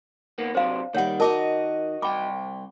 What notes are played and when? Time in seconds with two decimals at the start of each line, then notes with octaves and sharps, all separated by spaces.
0.38 D#3 A#3 B3
0.55 C3 F#3 D4 C5 F5
0.94 D#2 D#3 G3 C#5 F#5
1.20 D#4 F#4 A#4 D#5 A5 D6
2.02 C2 G5 B5 D6